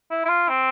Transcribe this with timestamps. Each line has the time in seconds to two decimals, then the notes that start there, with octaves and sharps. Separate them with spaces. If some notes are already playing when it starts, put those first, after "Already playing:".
0.10 E4
0.25 E4
0.29 F4
0.49 C4